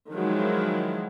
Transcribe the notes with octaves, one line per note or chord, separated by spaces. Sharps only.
D#3 F3 F#3 G#3 E4